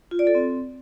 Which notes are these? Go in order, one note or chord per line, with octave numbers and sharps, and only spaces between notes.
F4
D5
A4
C4